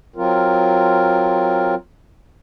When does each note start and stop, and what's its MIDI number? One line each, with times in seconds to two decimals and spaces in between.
0.16 1.75 54
0.16 1.75 60
0.16 1.75 65
0.16 1.75 70